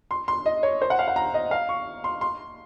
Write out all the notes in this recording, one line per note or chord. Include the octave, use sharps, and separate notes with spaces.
C6
C6
D#5
C#5
C5
F#5
F5
F#5
A#5
D#5
F5
C#6
C6
C6